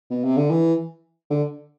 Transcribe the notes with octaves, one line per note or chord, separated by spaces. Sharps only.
B2
C3
D3
E3
D3